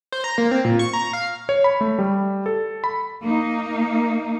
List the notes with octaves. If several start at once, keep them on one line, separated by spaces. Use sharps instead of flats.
C5
A#5
A#3
C4
A#2
C#6
A#5
F5
C#5
B5
A3
G3
A4
B5
A#3 D#4